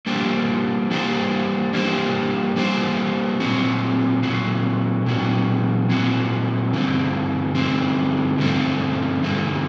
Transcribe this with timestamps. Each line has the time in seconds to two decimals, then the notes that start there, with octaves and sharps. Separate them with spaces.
0.07 G3 A#3 D4 G4 C5
0.91 G3 A#3 D4 G4 C5
1.73 G3 A#3 D4 G4 C5
2.56 G3 A#3 D4 G4 C5
3.40 A#2 F#3 C4 F#4
4.23 A#2 F#3 C4 F#4
5.06 A#2 F#3 C4 F#4
5.89 A#2 F#3 C4 F#4
6.73 G2 D3 A3 C4
7.55 G2 D3 A3 C4
8.38 G2 D3 A3 C4
9.23 G2 D3 A3 C4